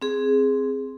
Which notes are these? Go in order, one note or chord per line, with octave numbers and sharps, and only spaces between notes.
C4 G#4